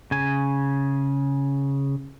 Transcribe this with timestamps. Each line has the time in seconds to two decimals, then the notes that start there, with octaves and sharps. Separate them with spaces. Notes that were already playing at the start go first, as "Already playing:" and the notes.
0.11 C#3 G#5